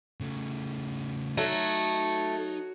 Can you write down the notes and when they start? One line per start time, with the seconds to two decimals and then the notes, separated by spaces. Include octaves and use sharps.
0.20 C#3 A3
1.37 F#3 A3 D#4